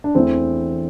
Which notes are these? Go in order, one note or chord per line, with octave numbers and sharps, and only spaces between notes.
D4
E2 E3 A3 C4